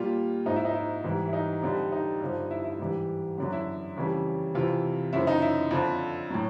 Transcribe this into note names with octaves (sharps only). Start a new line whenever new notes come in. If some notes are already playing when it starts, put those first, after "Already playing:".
Already playing: A#2 G3 F4
G#2 F3 D#4
E4
D#4
E4
G#2 E3 G3
E4
D#4
F2 D3 G3
D#4
G2 D3 F3
E4
E4
G#2 E3 G3
F#2 D3 F#3
E4
F2 C#3 E3 G3
F2 C3 E3 F4
F#2 C#3 F3 E4
D#4
E4
F2 D3 F3
A2 F#3